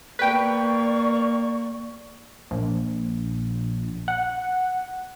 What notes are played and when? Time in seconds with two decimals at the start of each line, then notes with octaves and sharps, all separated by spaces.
0.19 A#3 B4 D5 G5 C#6
2.51 A#1
4.08 F#5